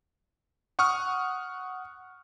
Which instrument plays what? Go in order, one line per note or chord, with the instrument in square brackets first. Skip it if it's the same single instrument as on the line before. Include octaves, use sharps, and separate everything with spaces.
[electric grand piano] F#5 C#6 D#6 F6